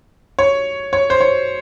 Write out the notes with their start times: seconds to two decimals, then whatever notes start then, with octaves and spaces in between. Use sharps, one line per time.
0.39 C#5
0.93 C#5
1.10 C5
1.21 C#5